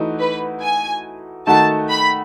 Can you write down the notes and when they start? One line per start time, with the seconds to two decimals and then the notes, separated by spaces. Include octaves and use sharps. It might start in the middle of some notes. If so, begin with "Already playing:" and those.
Already playing: E3 A3 D#4 F#4
0.19 B4
0.63 G#5
1.47 D#3 A3 D#4 F#4 A5
1.90 B5